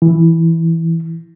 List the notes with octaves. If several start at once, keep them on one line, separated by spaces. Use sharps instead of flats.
E3